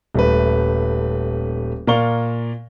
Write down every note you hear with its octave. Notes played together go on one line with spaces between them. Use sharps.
D#1 A3 B4
A#2 A#4 D5 F5 C#6 G7